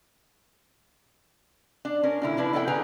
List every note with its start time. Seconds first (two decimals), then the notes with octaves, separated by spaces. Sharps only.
1.85 D4
2.03 C#4 A#4
2.22 A#2 D3 E4
2.37 F3 D4 E4 B4
2.53 B3 E4 A4 D5 F5 G5
2.68 D3 G#4 B4 G5 G#5 A#5